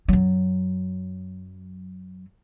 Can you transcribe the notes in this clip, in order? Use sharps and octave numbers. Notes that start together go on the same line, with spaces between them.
F#2 F#3